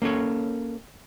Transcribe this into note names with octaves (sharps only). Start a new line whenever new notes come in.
A#3 C#4 A4 C#5